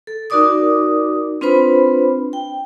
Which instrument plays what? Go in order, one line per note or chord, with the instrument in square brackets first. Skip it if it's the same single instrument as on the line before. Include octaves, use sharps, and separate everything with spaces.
[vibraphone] A4
D#4 F#4 A#4 D5 D6 D#6
C4 D4 F4 B4 C5 B5
G5